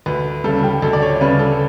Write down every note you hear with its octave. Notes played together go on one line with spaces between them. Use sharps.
D2 B4
C#3 G3 A4
G4
D2 A4
D5
C#5
C#3 G3 B4
A4